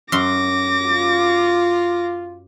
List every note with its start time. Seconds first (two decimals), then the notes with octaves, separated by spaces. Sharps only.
0.12 F#2 C6 D6 A#6
0.86 F4